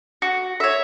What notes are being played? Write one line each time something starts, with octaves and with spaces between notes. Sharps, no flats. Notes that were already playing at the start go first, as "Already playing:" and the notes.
F#4
C#5 E5